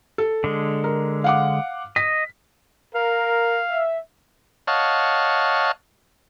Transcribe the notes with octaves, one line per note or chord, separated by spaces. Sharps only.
A4
D3 G#3
A#4
F5 F#5 D6
D#5 B6
A#4 F5
E5
C#5 D#5 F5 F#5 A5